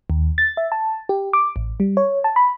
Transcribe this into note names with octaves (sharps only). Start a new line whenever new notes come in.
D#2
A6
E5
A5
G4
D6
A1
G3
C#5
A5
B5